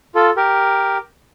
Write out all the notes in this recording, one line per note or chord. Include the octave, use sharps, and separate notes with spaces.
F4 A4
G4 A#4